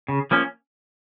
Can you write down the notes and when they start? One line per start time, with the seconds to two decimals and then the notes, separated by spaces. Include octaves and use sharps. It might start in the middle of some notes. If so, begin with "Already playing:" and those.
0.08 C#3
0.31 F3 A#3 C#4